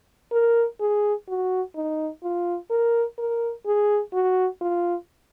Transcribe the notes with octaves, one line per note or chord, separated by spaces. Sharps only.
A#4
G#4
F#4
D#4
F4
A#4
A#4
G#4
F#4
F4